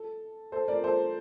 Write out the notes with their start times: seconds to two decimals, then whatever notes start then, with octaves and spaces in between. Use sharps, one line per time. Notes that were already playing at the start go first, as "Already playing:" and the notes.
Already playing: A4
0.52 A4 C5
0.68 A#4 D5
0.84 A4 C5